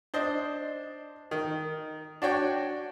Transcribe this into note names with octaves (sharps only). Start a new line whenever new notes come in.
D4 C5 D#5
D#3
D4 F#4 C#5 G5